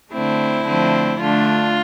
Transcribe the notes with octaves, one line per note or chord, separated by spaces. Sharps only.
D3 A3 C4 E4
D3 F3 A3 C4
D3 A3 D4 F4